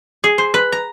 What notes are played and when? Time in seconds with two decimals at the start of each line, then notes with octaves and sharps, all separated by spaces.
0.24 G#4
0.38 C5
0.54 B4
0.72 A#5